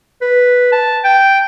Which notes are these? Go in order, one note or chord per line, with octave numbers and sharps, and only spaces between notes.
B4
A5
G5